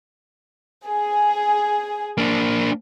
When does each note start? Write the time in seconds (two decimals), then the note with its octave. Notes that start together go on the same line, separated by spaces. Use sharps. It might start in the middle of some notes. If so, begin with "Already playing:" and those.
0.86 G#4
2.18 A#3 D4